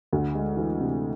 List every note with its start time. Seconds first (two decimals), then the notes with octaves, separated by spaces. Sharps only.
0.13 D2
0.35 G#3
0.57 E3
0.80 C3